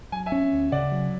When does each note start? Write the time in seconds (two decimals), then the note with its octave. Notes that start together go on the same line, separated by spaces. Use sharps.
0.12 F#3 G#5
0.26 E5 G#5
0.32 C#4
0.52 D2
0.72 C#3 D5 F#5
0.92 F#3